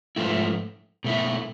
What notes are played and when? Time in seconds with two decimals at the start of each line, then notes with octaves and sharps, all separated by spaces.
0.16 G#2 F3 A3 E4
1.04 B2 A3 E4